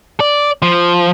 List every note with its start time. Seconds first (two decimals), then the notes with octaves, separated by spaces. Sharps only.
0.20 D5
0.62 F3